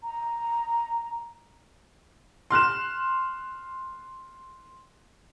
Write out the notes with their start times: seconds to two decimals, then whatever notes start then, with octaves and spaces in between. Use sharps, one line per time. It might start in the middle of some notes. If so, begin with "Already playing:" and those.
0.03 A#5
2.50 C6 F6 F#6 E7